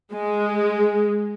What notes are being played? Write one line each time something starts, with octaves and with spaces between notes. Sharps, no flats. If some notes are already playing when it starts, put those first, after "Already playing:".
G#3